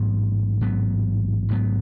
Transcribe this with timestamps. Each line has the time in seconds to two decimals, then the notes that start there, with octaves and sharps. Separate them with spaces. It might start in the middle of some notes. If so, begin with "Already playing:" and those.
Already playing: A1 G#2 F#3 B3
0.61 A1 G#2 F#3 B3
1.49 A1 G#2 F#3 B3